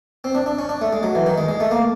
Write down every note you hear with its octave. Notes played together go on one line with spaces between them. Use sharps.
C4
D4
D4
C#4
D4
A3
G#3
F#3
E3
D#3
G#3
G#3
A3
A#3